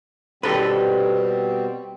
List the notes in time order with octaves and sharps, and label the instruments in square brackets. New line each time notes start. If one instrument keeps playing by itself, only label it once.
[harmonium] B2 G3 C4 [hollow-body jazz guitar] G4 A4 B4